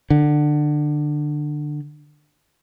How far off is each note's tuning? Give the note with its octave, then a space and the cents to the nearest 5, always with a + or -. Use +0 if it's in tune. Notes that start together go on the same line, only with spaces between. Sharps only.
D3 +20